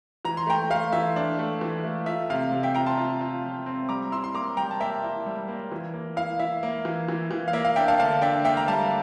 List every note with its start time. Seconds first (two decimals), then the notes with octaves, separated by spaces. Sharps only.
0.25 E3 A#5
0.37 C6
0.47 A3 G5 A#5
0.70 A3 F5
0.93 E3 E5
1.16 D4
1.39 A3
1.61 E3
1.84 A3
2.06 F4 E5
2.30 C3 F5
2.52 C3
2.63 E5 G5
2.75 F4 G5 A#5
2.86 A5 C6
2.98 F4
3.21 F4
3.44 F3
3.66 C4
3.89 G3 A#5 D6
4.12 E4 C6 E6
4.24 C6
4.34 A#3 A#5 D6
4.57 G3 G5 A#5
4.71 A5
4.80 A#3 E5 G5
5.03 E4
5.26 G3
5.48 A#3
5.72 E3
5.94 A#3
6.16 E4 F5
6.40 E4 E5
6.63 A#3
6.85 E3
7.09 E3
7.31 E3
7.48 F5
7.53 A#3 E5
7.65 F5
7.76 D4 E5 G5
7.88 F5 A5
7.99 D3 F5 A5
8.22 D4 E5 G5
8.44 A#3 E5 G5
8.57 A#5
8.68 G3 F5 A5